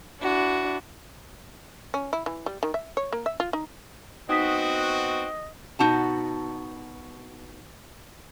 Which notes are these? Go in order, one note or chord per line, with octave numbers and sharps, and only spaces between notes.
D4 E4 F#4
C#4
E4
E3
G3
D#3
E5
C#5
A#3
E5
F4
D#4
B3 C4 D#4 F#4 D#5 D#6 B6
B2 D#4 F#4 A5